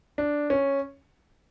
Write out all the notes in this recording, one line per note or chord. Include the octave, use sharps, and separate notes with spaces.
D4
C#4